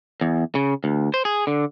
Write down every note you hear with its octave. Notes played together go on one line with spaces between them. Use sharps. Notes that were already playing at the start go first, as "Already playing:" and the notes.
E2
C#3
D2
C5
G#4
D3